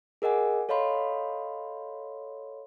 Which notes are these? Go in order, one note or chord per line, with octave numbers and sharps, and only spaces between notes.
G#4 A#4 D#5 F#5 G#5
A4 C#5 D#5 F5 B5 C6